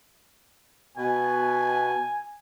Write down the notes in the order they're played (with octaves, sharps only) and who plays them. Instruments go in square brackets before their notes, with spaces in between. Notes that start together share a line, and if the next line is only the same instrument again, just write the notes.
[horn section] B2 [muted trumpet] G#5